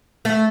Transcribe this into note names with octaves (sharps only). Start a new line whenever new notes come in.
A3